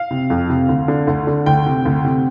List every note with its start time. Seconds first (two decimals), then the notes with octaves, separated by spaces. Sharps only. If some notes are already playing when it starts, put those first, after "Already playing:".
Already playing: F5
0.11 C3
0.30 F2
0.50 C3
0.69 D2
0.88 D3
1.07 D2
1.27 D3
1.46 D2 G5
1.66 C3
1.85 D2
2.04 C3